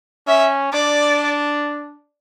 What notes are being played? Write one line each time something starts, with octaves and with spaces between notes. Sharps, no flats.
C#4 E5
D4 D5